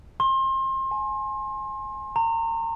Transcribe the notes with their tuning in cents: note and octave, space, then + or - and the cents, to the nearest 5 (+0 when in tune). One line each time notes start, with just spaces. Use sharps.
C6 +30
G#5 +20
A#5 -30